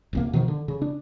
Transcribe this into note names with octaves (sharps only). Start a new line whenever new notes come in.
D#1 C2 A#3
B2 D#3 F3
D3
C#3
D4